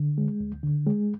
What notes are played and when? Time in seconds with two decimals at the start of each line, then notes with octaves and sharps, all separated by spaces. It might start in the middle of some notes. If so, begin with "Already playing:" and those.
Already playing: D3
0.18 G#3
0.40 D2
0.63 D3
0.87 G#3